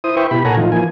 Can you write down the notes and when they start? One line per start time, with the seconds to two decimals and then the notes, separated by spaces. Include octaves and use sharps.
0.04 E4 C5 D#6
0.17 E4 B4 C5 E5 G5 C#6
0.31 B2 E4 G4 B5
0.45 A#2 A4 C#5 F#5 G#5 A#5
0.57 A2 E3 F3 D#4 F4
0.72 E3 F3 A#3 G#5